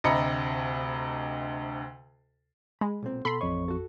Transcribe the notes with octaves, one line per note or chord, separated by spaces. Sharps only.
D2 C3 D#5 A#5 B5 C#7
G#3 B5
B1 A#2 C4
B2 B3 A4 B5 C6
A1 F2 C#5 D#5 C#6
F#4 A4